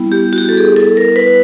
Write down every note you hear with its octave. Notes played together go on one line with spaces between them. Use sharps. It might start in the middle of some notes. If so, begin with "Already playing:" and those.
Already playing: G3 B3 E4
G4
F#4
G4
A4
G#4
A4
A#4
B4